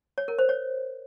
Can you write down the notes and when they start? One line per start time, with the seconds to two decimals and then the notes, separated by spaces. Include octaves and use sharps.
0.18 C#5
0.28 A#4
0.39 C5
0.49 C#5